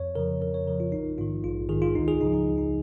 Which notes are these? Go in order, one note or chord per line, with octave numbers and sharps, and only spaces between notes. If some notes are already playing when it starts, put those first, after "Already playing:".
Already playing: F2 C#5
C#3 F3 A#4
F2 A#4
C#5
C#3 F3 A#4
F4
A#1 D#4
G#2 D#3 F4
A#1 F4
G#2 D#3 G#4
F4
C#2 D#4
G#4
C#3 F3 D#4
D#4
C#2
D#4